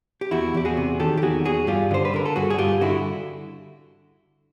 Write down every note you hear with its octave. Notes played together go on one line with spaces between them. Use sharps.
G4
E2 E4 F#4
E2 G4
F#4 G#4
C3
D#3 G4 A4
G4
E2 F#4 G#4
E2 F#4 G#4
G2 F4 G4
D3 C5
B4
D3 A#4
A4
G2 F#4 G#4
G#4
G2 F4 G4
D3 E4 F#4